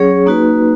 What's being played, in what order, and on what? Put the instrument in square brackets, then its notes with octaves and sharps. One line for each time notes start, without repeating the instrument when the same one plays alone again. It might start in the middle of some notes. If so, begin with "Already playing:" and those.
Already playing: [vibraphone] F#3 C#4 G#4 C#5
A#3 D#4 F#4 B4